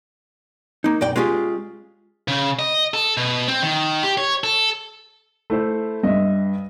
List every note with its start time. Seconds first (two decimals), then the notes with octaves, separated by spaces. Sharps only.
0.84 A#3 D#4
1.01 B1 F#2 D5 G5
1.16 G#3 C#4 F4 G4 G#4
2.28 C#3
2.59 D#5
2.94 A4
3.17 B2
3.48 C4
3.62 D#3
4.03 G4
4.18 C#5
4.44 A4
5.50 A3 E4 C5
6.03 G2 D#5 E5